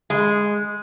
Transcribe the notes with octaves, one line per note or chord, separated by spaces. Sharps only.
G#3